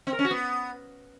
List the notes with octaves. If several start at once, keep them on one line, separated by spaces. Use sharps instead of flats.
C4
A#4
C#4
F#4
B3